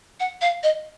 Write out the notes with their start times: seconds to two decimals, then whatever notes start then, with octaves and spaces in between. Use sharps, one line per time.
0.20 F#5
0.41 F5
0.63 D#5